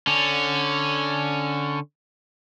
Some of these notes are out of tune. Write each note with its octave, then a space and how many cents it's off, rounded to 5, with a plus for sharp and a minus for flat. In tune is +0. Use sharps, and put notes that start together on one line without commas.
D3 -5 C#4 +0